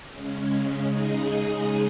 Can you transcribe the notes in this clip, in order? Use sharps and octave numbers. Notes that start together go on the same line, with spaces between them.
C#3 G#3 C#4
C#3 G#3 D#4 G#4 D#5